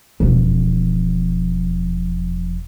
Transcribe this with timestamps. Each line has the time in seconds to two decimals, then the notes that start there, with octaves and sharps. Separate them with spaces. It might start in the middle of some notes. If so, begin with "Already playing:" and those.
0.20 E1 F2